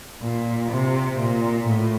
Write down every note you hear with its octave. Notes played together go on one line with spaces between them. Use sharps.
A#2
C3
A#2
A2